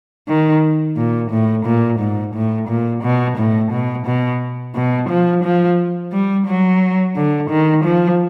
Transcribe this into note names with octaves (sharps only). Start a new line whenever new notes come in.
D#3
A#2
A2
A#2
G#2
A2
A#2
B2
A2
B2
B2
B2
F3
F3
G3
F#3
D3
D#3
F3